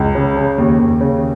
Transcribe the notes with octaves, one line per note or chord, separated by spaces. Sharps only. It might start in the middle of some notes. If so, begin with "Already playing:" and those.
Already playing: C#2
C#3
C#3
D#2
D#2
C#3